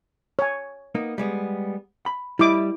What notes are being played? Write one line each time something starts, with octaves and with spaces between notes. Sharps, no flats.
C#5 G#5
A#3 B3 D#4
G3 G#3 B3
B5
G3 E4 D#5 D6